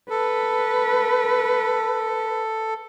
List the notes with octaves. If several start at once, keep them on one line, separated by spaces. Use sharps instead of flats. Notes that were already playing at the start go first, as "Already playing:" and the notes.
A4 B4